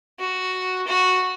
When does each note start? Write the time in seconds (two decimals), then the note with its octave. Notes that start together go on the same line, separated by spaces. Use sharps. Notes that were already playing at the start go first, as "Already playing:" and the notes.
0.19 F#4
0.87 F#4